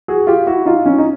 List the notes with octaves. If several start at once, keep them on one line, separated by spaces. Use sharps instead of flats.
F#4 G#4
F4 G4
E4 F#4
D#4 F4
C#4 D#4
D#4